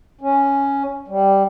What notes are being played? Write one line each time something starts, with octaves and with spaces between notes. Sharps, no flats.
C#4
G3